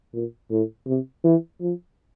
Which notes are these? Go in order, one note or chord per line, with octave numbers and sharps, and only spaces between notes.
A#2
A2
C3
E3
F3